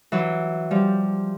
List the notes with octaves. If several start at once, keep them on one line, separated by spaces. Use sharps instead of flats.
E3 F#3
F3 G3